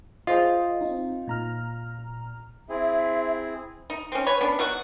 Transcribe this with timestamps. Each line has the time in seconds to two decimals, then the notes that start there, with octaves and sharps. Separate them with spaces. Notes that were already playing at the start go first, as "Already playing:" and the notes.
0.27 F4 G#4 C5 D#5
0.81 C4 D#4
1.27 A#2 A#5 F6
2.69 C4 E4 G#4 E5
3.90 D#4
4.12 C4 C#4
4.27 B4 C#5
4.41 B3 C#4 D4
4.59 B2 F#3 F#5 C#6